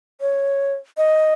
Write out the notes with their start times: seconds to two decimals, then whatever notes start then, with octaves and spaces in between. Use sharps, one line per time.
0.21 C#5
0.97 D#5